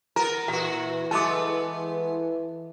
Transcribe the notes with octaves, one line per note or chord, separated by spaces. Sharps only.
B3 A#4 A#5
A#2 E3 F#4 F#5
G#3 A3 B3 A5 D6